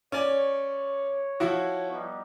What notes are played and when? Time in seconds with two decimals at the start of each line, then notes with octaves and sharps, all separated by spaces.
0.12 C#4 C#5 D5
1.40 F3 E4 F#4
1.91 G3 B3 D#4